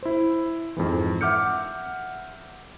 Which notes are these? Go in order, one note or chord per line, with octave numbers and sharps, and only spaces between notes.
E4 C5
F2 G#2 E3
E5 F#5 D6 F6 G6 C#7